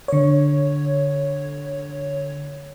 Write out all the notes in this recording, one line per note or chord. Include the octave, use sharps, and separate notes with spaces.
D3 C#5